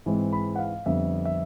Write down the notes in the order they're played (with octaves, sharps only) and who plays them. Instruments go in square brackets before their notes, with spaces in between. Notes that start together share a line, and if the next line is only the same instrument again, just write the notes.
[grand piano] G#2 E3 G#3 C4
B5
F#5
F5
F2 D3 G3 B3 E5
E5